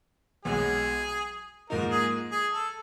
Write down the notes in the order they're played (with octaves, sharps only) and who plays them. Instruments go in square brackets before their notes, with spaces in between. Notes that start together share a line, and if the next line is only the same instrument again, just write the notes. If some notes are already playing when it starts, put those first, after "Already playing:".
[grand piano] B1 B2 G#3 [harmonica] G#4
[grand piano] G#2 F3 A#3 D#4 [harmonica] A#4
[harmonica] G#4
G#4
A4